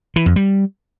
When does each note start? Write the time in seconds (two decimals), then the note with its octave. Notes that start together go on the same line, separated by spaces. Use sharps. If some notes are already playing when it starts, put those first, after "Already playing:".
0.16 E3
0.26 F2
0.36 G3